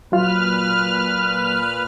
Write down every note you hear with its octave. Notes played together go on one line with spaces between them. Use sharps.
A#2 F#3 F4 B4 F6